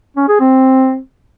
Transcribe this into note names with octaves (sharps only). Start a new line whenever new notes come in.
C#4
G#4
C4